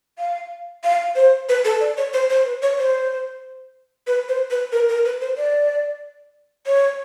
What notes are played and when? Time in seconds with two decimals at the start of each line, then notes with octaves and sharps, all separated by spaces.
0.19 F5
0.84 F5
1.16 C5
1.49 B4
1.65 A4
1.81 D5
1.97 C#5
2.13 C5
2.30 C5
2.45 B4
2.62 C#5
2.79 C5
4.07 B4
4.29 C5
4.51 B4
4.72 A#4
4.89 A#4
5.05 B4
5.21 C5
5.37 D5
6.67 C#5